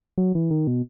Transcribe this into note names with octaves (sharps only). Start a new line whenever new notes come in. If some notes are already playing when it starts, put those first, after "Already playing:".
F#3
E3
D#3
B2